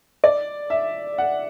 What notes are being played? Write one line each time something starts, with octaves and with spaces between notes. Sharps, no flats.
D5
E5
F#5